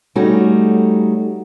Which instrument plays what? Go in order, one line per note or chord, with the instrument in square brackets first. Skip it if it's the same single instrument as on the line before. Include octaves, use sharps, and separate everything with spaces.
[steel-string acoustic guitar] G3 A3 C#4 D#4 F#4